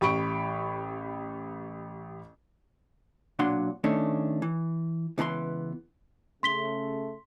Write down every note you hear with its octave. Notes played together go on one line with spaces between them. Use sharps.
A1 G4 B5 C#6 D7
B1 A#2 F#3 D4 F#5 C6
D#3 A3 C#4 D4
E3
C#2 E3 B3 A#5 C6
C#3 A3 C6 B6 G7